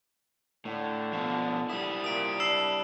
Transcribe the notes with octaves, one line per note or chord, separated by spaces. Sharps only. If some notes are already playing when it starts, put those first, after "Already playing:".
A2 D3
B2 F3
G3 E4 D#6
A#2 D#6 D7
D4 E6 C7 E7